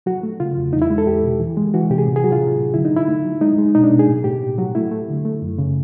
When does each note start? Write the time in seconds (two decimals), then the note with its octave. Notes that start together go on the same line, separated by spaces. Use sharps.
0.06 F#3 F#4
0.23 A3
0.40 C#3 F4
0.57 E2
0.73 E2 D#4
0.82 E4
0.90 G#3
0.98 A4
1.07 E2 G4
1.23 B2
1.40 E3
1.57 G#3
1.74 E3 F#4
1.90 C3 G4
1.98 G#4
2.07 A2
2.16 G#4
2.24 F#3 F#4
2.32 F4
2.41 F#3
2.58 A2
2.74 D3 E4
2.85 D#4
2.91 F#3
2.96 E4
3.08 A3
3.24 F#3
3.41 G#3 D#4
3.58 G#3
3.75 B2 D#4
3.84 D4
3.92 B2
3.99 G#4
4.08 A2
4.24 A2 G4
4.41 A2
4.58 F#3 F#4
4.75 A3 E4
4.91 A3
5.09 D3
5.25 A3
5.42 F#2
5.58 C#3